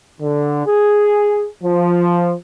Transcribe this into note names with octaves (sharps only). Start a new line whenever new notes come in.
D3
G#4
F3